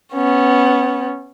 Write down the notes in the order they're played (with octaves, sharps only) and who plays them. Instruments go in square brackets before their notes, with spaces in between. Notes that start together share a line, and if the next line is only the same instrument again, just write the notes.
[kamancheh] B3 C#4